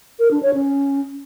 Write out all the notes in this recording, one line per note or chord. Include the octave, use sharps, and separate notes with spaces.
A#4
D4
C#5
C#4